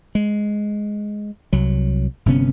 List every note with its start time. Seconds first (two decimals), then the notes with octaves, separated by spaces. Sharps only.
0.15 G#3
1.53 C2 F#3
2.26 G1 C3 B3 C#4